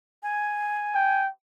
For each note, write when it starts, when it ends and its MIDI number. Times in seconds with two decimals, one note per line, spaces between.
0.23 1.22 80
0.95 1.29 79